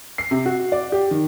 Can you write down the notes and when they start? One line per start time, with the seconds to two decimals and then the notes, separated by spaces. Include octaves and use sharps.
0.18 C7
0.31 C3
0.46 F#4
0.72 D5
0.92 G4
1.11 D#3